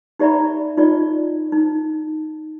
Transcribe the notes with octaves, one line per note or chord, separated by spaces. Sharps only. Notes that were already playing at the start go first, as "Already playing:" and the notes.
D#4 G4 D5 E5 A#5 B5
D#4 F4 G4 D5 D#5
D#4